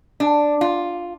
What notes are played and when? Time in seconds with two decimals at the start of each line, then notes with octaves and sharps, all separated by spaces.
0.20 D4
0.61 F4